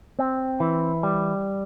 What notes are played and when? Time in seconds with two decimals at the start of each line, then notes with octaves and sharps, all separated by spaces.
0.19 C4
0.60 E3
1.03 G3